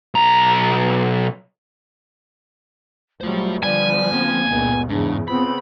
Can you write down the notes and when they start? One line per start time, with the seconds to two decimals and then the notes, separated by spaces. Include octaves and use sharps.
0.15 B1 A#5
3.21 A#1 F#3 G3 A3 F4 C5
3.63 D3 F3 G3 B3 D5 G#5
4.12 A#3 C4 G5
4.50 C#2 G2 A#2 B3
4.89 E2 G#2 C#3 D4
5.28 C#3 B3 C4 F4 B5